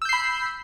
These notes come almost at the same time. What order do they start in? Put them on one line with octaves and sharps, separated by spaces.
E6 G6 C7 B5